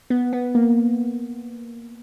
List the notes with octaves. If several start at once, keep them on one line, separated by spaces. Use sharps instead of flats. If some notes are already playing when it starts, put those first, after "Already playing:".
B3
B3
A#3